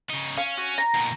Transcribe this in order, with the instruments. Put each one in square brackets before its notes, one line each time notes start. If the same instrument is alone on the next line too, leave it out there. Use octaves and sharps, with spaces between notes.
[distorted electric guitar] C#3 D#4
[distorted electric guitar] C#4 [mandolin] F5
[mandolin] F#4
A#5
[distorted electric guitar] D#2 B2